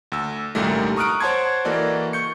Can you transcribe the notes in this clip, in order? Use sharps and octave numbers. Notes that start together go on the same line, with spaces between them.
D2 E6
C2 F#2 A#2 D#3 G3 A3
A#5 C#6 D#6 F6 F#6 D7
C5 C#5 F#5 A5 C6 G#6
E3 A#3 F#4 A4 D5 D#5
C#6 G6 C#7